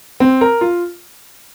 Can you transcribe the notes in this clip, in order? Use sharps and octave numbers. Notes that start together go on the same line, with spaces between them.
C4
A#4
F4